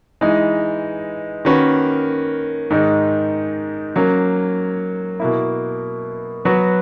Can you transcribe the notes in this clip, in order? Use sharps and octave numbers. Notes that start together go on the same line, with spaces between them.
E3 G#3 D#4
D#3 A#3 C#4 F#4 B4
G#2 D#3 G#3 D#4
F#3 A#3 C#4
B2 A#3 E4
F#3 B3 F#4 B4